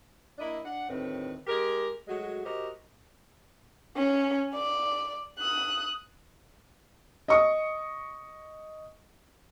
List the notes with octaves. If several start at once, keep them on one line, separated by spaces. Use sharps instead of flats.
A#3 D4 E4 D#5 E5
D4 F#5
D2 A2 D#3 C4 B4
G#3 G4 A#4
F#3 G#3 A3 F#4 G#4
F#4 G4 A#4 C5 D#5
C#4
D5
D#6 F#6
D#5 C#6 D#6